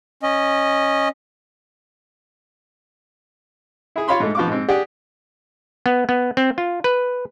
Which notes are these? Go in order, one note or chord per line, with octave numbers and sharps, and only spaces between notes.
C#4 D#5
E4 G#4
F4 C#5 F5 B5 C6
G#2 A3
F3 B3 F5 C#6 D6
G#2 C4
G4 G#4 D5 F#5
B3
B3
C4
F4
B4